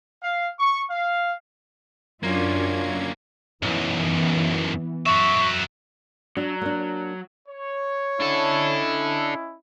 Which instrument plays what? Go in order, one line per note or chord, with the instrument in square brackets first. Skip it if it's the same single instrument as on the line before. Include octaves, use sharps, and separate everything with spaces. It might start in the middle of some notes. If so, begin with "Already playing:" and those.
[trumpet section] F5
C#6
F5
[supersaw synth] F#2 G#6 [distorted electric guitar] A#3 C#4 [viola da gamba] D4 F4
[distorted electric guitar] B1 F#2 [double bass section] E3 B3
[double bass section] F#2 [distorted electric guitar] F#4 E5 [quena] C#6
[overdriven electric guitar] F#3 [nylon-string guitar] D4
[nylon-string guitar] A#3 D4
[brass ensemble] C#5
[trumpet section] C#4 E4 D#5 [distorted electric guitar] D4 A4